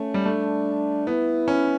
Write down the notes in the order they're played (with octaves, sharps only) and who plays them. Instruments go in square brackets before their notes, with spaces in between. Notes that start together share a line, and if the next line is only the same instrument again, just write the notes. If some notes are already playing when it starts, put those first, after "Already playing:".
Already playing: [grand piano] A3 [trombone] C#4
[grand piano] G3
[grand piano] A3 [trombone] D4
[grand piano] B3 [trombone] E4
[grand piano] C#4